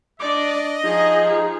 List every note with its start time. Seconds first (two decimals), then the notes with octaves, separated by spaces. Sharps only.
0.20 D4 D5 D#5 D6
0.84 F3 D#4 G#4